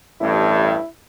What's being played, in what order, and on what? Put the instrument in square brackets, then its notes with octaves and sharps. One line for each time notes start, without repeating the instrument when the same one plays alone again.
[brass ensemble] A1 G2 [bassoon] E4